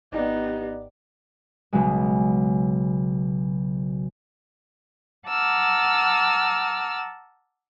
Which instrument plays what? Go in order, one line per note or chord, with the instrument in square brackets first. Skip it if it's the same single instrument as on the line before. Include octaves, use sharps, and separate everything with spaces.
[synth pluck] G#1 G4 D5 [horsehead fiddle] B3 D#4
[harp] B1 C#3 F#3 G#3
[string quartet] F#5 A5 A#5 D6 E6 F6